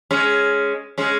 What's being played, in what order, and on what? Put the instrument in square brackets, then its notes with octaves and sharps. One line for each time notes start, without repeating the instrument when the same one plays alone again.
[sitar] G#3 C#4
G#3 C#4